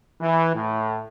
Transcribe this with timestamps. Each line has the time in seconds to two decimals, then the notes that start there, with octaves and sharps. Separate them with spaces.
0.20 E3
0.54 A2